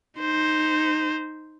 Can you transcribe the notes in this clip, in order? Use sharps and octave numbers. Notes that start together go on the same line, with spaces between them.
D#4 C5